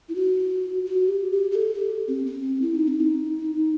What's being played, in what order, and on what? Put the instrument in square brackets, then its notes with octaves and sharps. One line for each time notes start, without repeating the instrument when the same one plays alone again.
[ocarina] E4
F#4
F#4
G4
G4
G4
A4
G4
C4
C4
E4
D#4
C4
D#4